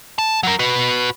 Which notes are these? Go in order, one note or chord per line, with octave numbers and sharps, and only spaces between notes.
A5
F#3 A#4
F#4 B4